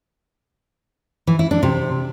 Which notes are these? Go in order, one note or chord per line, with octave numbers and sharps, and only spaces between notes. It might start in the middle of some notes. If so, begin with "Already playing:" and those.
E3
E4
D4
C3